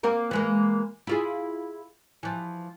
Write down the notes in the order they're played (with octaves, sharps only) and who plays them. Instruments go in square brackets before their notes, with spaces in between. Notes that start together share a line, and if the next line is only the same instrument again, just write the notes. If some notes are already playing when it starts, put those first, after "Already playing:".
[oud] A#3 C4 A#4
E3 G#3 A#3
E4 F4 G#4
E3 F3